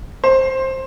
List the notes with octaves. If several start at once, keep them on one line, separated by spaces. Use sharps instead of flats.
C5